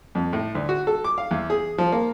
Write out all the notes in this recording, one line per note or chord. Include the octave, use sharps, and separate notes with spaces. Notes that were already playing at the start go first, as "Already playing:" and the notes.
F2
A2
D2
F#4
A4
D6
F5
E2
G#4
F3
A#3